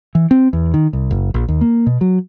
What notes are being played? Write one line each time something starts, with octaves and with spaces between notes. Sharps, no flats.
E3
C4
E2
D#3
C2
F#1
A#1
D#2
A#3
B2
F#3